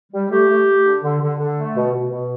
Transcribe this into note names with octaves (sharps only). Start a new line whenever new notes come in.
G3
A3 G4
A3
A3
D3
D3
D3
D3
A3
B2
B2
B2